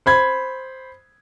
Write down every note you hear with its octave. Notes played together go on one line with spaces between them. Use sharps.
C5 B5 G#6